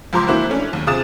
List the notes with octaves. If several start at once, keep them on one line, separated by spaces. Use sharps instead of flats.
C#2 F3 A#5 C6 D6
E3 A#3 E4 F#4 C5
A3 C#4 D4
D#2
C3 F4 G#4 D#6 A6 E7